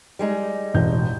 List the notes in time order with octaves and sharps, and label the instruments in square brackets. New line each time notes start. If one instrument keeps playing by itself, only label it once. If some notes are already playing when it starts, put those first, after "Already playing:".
[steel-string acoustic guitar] G3 G#3 D#4
[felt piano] E1 A1 G6